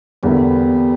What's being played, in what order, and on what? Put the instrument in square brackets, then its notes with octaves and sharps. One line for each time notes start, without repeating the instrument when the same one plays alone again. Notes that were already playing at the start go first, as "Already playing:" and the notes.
[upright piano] E2 D3 A#3 E4 [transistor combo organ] G3 B3